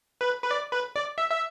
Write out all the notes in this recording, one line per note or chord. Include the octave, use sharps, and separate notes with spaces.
B4
B4
D5
B4
D5
E5
E5